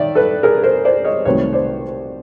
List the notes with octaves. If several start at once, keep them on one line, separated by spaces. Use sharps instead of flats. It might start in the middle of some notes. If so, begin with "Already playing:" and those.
Already playing: D#3 D5 E5
A4 B4
G#4 A#4
A#4 C5
C5 D5
C#5 D#5
C2 C3 D#3 F#3 A3 B4 C#5
C5 D5